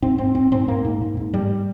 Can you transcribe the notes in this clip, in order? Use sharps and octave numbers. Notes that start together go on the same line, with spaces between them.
G#2 C4
G#2 C4
G#2 C4
G#2 C4
G#2 A#3
G#2
G#2
G#2
G2 G3